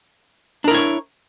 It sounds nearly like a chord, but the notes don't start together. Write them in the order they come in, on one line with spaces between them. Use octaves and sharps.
D4 A#4 E4 C#5